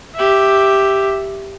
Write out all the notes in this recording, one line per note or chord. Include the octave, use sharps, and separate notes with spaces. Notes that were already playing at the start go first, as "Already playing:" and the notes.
G4 E5